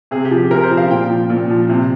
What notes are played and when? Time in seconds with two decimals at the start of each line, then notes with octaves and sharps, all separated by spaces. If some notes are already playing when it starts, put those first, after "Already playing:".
0.11 C3 G#4
0.25 G4
0.31 F3
0.38 G4
0.51 C3 A#4
0.64 C5
0.71 F3
0.77 F5
0.91 A#2 G5
1.10 F3
1.30 A#2
1.50 F3
1.69 C3